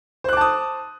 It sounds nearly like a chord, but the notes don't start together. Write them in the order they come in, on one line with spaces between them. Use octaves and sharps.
C5 F#6 D6 A5 D#6